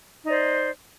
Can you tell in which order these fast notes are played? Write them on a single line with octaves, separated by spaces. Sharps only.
D#4 D5 C5